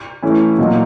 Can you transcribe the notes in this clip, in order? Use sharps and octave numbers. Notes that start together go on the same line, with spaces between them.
E3 A3 C#4 E4
A#2 F#3 A#3 D#4